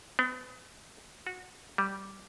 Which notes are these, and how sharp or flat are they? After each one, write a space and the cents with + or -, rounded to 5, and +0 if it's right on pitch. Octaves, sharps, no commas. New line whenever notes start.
B3 +40
F#4 -20
G3 -10